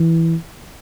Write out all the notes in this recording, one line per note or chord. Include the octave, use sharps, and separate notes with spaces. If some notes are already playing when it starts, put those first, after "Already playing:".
Already playing: E3